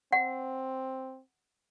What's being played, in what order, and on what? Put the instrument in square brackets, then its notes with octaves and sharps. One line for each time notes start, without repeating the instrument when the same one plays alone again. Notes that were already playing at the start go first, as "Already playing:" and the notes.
[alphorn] C4 [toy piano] F#5